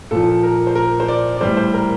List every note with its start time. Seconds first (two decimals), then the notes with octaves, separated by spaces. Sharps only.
0.11 A#2 F3 A4
0.43 A#4
0.67 C5
0.75 A#4
1.00 C5
1.08 D5
1.37 D5
1.41 A2 E3 G3 C5
1.57 C5
1.74 A#4